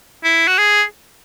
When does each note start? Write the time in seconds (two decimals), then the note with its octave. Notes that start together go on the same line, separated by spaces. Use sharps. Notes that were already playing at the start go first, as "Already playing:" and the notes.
0.24 E4
0.47 F#4
0.58 G#4